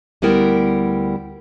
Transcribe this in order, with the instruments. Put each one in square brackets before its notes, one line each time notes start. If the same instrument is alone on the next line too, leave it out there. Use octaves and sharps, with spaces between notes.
[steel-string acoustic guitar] D2 G3 B3 E4 A#4 G5